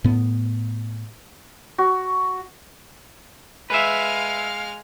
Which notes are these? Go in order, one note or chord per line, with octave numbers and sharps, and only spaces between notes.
A2 B3
F#4
G#3 B4 E5 F5 F6